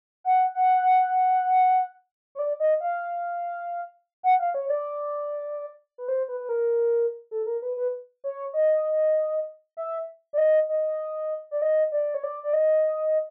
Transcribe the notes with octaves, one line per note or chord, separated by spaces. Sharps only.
F#5
F#5
C#5
D5
D#5
F5
F#5
F5
C#5
D5
B4
C5
B4
B4
A#4
A4
A#4
B4
B4
C#5
D#5
E5
D5
D#5
D#5
D5
D#5
D5
C#5
D5
D5
D#5